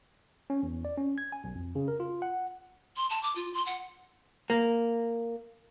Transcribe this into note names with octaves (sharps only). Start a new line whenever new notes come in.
C#4
E2
D5
C#4
G#6
G#5
B1
F2
C#3
A#4
F4
F#5
C6
A5
D6
F4
C6
F#5
A#3